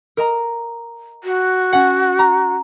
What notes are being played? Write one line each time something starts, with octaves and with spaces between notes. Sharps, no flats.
A#4 D#5 A#5
F#4
C#4 F#5
A#5